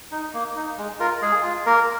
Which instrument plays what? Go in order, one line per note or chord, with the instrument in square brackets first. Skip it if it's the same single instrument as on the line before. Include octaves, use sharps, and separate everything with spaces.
[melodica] D#4
A#3
D#4
G#3
F4 A#4
G#3 G#4
F4
A#3 A#4